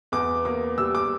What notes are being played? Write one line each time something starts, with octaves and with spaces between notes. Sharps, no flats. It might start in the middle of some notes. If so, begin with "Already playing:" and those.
E2 D6
A#3 D6
G3 E6
D6